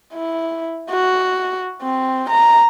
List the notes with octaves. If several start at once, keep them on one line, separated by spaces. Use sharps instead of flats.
E4
F#4
C4
A#5